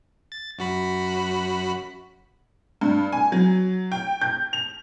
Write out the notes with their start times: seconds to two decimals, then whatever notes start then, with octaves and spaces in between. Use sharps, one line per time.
0.32 A6
0.59 F#2 F#4 B5
2.81 G2
3.12 G#5
3.32 F#3
3.92 G5
4.21 G6
4.53 F7